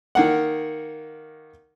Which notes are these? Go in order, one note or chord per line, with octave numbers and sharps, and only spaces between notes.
D#3 A#3 F#5